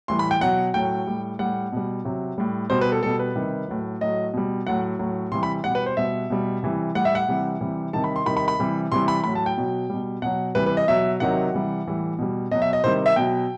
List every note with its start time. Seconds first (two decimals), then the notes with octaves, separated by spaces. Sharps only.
0.08 A2 E3 G3 C6
0.19 B5
0.31 G5
0.41 B2 F#3 F#5
0.74 A2 F#3 G5
1.07 A2 G3
1.39 A2 G3 F#5
1.72 B2 G3
2.05 C3 F#3
2.38 A2 G3
2.70 B2 G3 C5
2.81 B4
2.92 A4
3.03 B2 G3 A4
3.19 B4
3.35 C3 D#3 G3
3.68 A2 F#3
4.01 A2 F#3 D#5
4.33 B2 G3
4.67 A2 F#3 F#5
4.99 A2 F#3
5.32 C3 E3 G3 C6
5.43 B5
5.64 B2 G3 F#5
5.75 B4
5.86 C5
5.97 B2 G3 E5
6.30 B2 G3
6.63 C3 E3 G3
6.95 A2 G3 F#5
7.05 E5
7.15 F#5
7.28 C3 E3 G3
7.61 C3 E3 G3
7.93 C3 D#3 G3 A5
8.04 B5
8.16 C6
8.26 C3 D#3 G3 B5
8.37 B5
8.48 B5
8.59 C3 E3 G3
8.92 C3 E3 G3 C6
9.08 B5
9.24 A2 F#3 B5
9.35 A5
9.46 G5
9.57 B2 F#3
9.90 B2 G3
10.22 B2 F#3 F#5
10.55 C3 E3 G3 B4
10.66 B4
10.77 D#5
10.87 B2 F#3 E5
11.20 C3 D#3 F#3 F#5
11.54 C3 E3 G3
11.86 A2 E3 G3
12.19 B2 G3
12.51 B2 D#5
12.55 F#3
12.62 E5
12.73 D#5
12.84 C3 D#3 G3 C5
13.06 E5
13.16 B2 F#3 G5